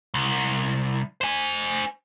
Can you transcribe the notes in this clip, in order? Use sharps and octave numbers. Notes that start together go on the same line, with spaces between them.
C2
C5 G#5